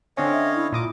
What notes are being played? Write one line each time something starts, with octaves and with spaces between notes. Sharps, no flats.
D3 C4 C#4 C#5 D#5 F5
E5
E4
A#2 D#5 D6